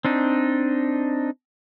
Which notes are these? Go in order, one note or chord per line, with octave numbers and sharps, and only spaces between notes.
C4 D4 D#4